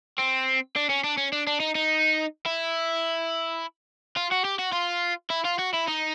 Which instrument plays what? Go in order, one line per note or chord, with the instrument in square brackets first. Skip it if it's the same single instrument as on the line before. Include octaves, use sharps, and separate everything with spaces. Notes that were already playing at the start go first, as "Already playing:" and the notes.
[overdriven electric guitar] C4
D4
C#4
D4
C#4
D4
D4
D#4
D#4
E4
F4
F#4
G4
F#4
F4
E4
F4
F#4
E4
D#4